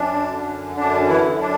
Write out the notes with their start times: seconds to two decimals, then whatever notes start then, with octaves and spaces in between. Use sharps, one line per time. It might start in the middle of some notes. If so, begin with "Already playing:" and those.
Already playing: F#2 D4
0.30 D3
0.76 F#2 D4
1.07 E3 E4
1.23 F#2
1.39 D4